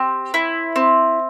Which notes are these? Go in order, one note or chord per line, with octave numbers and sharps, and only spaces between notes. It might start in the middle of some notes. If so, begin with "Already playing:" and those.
Already playing: C4 G4
E4
C4